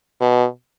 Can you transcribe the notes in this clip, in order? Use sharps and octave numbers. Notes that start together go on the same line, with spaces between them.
B2